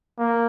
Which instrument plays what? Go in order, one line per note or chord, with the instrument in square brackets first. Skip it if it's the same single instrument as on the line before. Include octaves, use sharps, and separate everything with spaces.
[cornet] A#3